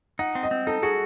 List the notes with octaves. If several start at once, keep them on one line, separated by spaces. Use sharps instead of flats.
D#4 F#5
C4
D#5
C4
D#4 A4
F#4 G#4